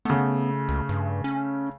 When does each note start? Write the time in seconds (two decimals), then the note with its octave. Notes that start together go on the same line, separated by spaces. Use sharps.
0.05 C#3 A3 B3
0.69 C#2
0.89 G2
1.24 C#4